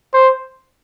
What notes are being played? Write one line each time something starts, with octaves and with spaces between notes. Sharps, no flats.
C5